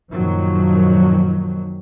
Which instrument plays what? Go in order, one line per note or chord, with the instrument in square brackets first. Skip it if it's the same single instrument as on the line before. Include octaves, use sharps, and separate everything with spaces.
[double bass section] F#2 A#2 D#3 F3 F#3